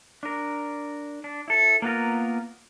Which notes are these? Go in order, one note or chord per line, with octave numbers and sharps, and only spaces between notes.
D4 A#4
D4
E4 A4
A#3 B3 F4 A#4